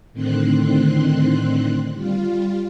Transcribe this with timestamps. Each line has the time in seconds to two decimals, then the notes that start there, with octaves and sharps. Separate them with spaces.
0.13 A2 D3 D#3 C4 C6 F#6
1.94 G3 F4